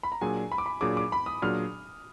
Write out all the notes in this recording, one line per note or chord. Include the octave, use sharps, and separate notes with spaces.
B5
A#5
A#2 F#3 D4 G#4 G#5
B5
D6
B5
A#2 F#3 D4 G#4 D6
D6
B5
D#6
A#2 F#3 D4 G#4 F6